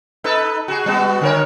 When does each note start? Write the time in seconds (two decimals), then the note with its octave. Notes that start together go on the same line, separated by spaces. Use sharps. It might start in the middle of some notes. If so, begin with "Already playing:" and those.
0.24 D#4 A4 B4
0.68 F#4 G#4
0.86 G3 B3 F#4
1.21 D3 A#4 C#5